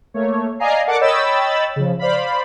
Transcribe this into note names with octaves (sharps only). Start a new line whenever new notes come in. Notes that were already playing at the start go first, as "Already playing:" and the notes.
A3 A#3 C#5
D5 D#5 F5 G#5 A#5 C7
A4 A#4 D5 F#5 A5 D6
C#5 D#5 G5 B5 E6 A6
C#3 F3
C5 D5 F5 B5